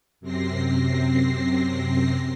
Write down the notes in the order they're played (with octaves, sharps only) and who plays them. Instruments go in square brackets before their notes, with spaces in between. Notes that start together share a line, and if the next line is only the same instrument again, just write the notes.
[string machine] F#2 C3 C4 A#6 C7